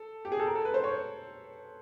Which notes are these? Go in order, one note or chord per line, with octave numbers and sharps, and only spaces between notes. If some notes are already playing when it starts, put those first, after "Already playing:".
Already playing: A4
G4
G#4
A4
A#4
A4
B4
C5
C#5